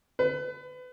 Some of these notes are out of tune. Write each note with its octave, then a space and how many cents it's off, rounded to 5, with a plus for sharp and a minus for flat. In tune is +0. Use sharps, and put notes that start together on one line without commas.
B4 +30